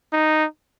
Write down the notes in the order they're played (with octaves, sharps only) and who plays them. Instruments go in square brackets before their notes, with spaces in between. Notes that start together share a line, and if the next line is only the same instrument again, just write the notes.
[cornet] D#4